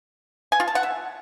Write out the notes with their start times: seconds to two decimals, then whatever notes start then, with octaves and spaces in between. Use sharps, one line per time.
0.52 G#5
0.60 F4
0.68 A5
0.75 F#5
0.83 E5